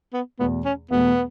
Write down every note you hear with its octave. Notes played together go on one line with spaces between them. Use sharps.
B3
E2 B2 A3 B3
C#4
E2 B2 A3 B3